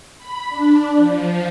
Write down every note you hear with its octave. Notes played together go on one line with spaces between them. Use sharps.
B5
D4
F3